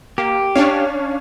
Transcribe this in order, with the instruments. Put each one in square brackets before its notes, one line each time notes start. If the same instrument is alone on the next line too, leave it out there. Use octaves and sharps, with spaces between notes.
[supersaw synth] A#3 [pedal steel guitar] G4
[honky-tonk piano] C#4 [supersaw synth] D4 C#5 F5